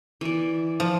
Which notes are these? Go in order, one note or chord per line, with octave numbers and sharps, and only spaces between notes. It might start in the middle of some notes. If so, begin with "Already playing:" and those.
E3 D5
F3